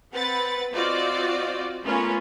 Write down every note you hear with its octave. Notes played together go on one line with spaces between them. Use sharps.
C4 B4 F#5 A6
C4 F4 F#4 D5 D#5
A3 B3 C#4 F4 A#4 B4